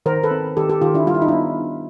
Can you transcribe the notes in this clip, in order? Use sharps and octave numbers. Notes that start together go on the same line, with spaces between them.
D#3 A#4 C5
A4 B4
C4
D#3 G4 A4
G4 A4
D#3 F4 G4
D4 E4
G3 F4
E4
D#4
B3 D4 E4